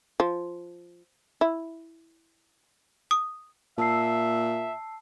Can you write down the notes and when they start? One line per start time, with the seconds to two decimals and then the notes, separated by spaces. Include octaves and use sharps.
0.20 F3
1.41 E4
3.11 D#6
3.78 A#2 E5 A5 E6 C7